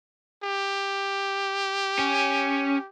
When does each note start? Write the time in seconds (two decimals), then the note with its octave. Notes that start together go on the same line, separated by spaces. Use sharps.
0.44 G4
1.99 C#4